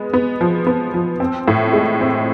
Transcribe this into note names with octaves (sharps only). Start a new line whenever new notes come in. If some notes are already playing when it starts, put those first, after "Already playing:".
Already playing: G#3 B3
B3
F3
B3
F3
C4
A2
G#3
C4